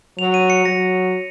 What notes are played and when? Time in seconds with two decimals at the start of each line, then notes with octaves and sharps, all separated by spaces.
0.18 F#3 F7
0.34 D#7
0.50 C#7
0.65 F#3 A#6